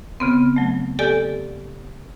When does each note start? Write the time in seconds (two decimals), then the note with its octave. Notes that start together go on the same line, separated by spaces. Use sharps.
0.20 C#3 B3 C4
0.56 F#3 A3
0.99 G4 A4 D5 G#5